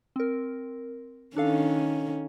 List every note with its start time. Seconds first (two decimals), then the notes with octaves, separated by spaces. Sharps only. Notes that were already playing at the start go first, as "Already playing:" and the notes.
0.16 C4 A#4
1.36 D#3 C#4 D4 A4 F5